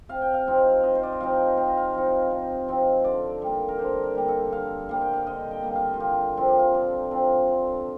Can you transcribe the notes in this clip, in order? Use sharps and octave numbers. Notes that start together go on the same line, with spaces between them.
C3 F5
G5
F5
F3 C4 D#4
C3 D#5
C5
D5
D#5
F3 C4 D#4 F5
C3 F5
D#5
F5
F3 C4 D#4
C3
F3 C4 D#4
D3 D5
G3 A#3
A#4
D3 C5
A#4
G3 A#3
A4
D3 F5
G3 A#3 F5
G5
F5
D3 D#5
G5
G3 A#3
F5
F4
D3 G4
F3 C4 F4
G4
F4
D3
F3 C4
D3